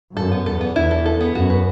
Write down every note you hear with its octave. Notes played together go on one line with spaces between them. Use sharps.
F#2 A4
B3
E2 A4
B3
E2 E4
A4
A4
B3
F#2 F#4
B4